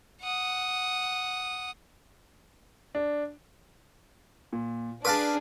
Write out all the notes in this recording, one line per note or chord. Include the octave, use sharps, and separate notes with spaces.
F#5 D#6
D4
A#2
D4 G#4 B4 F5 A5 D6